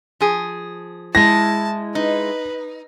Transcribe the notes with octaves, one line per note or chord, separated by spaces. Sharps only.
F3 G#4
G#3 E4 A5 A#6
D#4 B4